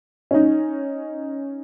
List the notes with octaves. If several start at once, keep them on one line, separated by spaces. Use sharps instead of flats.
C#4 D#4